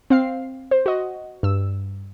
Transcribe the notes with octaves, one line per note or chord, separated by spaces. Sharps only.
C4 F5 C7
C5
F#4 D#5
G2 E6